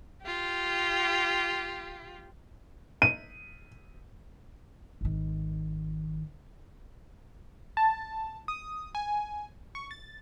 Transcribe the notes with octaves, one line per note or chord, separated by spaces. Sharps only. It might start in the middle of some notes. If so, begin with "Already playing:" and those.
F4 G4
D#7
G#1 D#3
A5
D#6
G#5
C#6
A6